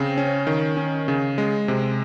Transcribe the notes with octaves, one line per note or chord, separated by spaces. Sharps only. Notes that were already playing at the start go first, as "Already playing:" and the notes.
Already playing: C#3 C4
C#4
D#3
C#4
C#3
G#3
C3